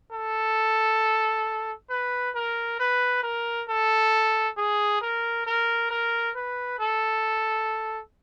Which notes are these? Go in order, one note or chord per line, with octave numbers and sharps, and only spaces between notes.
A4
B4
A#4
B4
A#4
A4
G#4
A#4
A#4
A#4
B4
A4